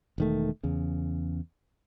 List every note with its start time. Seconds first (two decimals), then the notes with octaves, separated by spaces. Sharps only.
0.18 E1 D#3 A3
0.63 E2 C#3